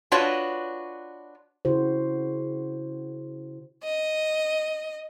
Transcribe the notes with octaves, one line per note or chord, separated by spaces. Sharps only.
D4 F4 F#4 B4 C#5 D#5
C#3 E4 F#4 C5
D#5